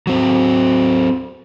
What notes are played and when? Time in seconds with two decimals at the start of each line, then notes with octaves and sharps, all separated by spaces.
0.07 F#3 C4